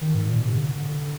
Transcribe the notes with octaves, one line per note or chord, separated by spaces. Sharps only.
D#3
G#2
A#2
C3
D3